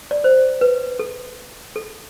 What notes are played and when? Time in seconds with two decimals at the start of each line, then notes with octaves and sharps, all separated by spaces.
0.11 D5
0.24 C5
0.61 B4
0.99 A4
1.76 A4